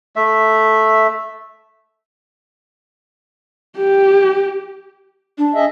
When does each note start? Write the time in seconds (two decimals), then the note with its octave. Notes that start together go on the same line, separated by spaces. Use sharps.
0.16 A3 E5
3.78 G4
5.38 D4
5.54 G#4 D#5 E5